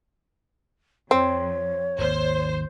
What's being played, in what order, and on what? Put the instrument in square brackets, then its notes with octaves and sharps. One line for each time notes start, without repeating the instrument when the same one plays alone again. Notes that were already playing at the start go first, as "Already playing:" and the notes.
[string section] F2 [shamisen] C4 [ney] C#5
[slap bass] G#1 D#2 [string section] C5